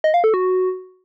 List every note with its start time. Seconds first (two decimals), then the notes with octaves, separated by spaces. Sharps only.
0.04 D#5
0.14 F5
0.24 A4
0.34 F#4